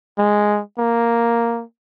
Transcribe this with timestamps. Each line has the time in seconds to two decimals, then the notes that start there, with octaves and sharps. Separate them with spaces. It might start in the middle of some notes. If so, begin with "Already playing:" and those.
0.19 G#3
0.79 A#3